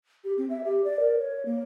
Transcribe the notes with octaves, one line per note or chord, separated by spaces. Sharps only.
G4
C4
E5
G4
D5
A#4
C#5
A#3